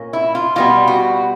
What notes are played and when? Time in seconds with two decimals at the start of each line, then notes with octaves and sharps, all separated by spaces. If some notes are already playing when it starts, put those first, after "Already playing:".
Already playing: A#2 A#3 C#4
0.13 E4
0.35 F4
0.56 B2 G3 B3 F4
0.87 F#4